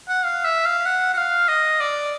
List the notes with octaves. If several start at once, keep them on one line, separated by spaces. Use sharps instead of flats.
F#5
F5
E5
F5
F#5
F#5
F5
D#5
D5